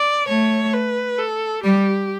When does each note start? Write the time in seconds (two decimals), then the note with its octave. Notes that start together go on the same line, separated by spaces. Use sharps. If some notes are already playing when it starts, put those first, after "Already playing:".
Already playing: D5
0.28 A3 C#5
0.73 B4
1.18 A4
1.63 G3 G4